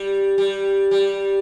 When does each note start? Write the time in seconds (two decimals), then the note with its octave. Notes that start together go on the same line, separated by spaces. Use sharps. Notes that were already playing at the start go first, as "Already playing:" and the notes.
Already playing: G3
0.38 G3
0.91 G3